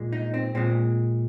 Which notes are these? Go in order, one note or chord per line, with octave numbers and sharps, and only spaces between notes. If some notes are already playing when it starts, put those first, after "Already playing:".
Already playing: A#2 G#3
D#4
C4
A#2 G#3 C4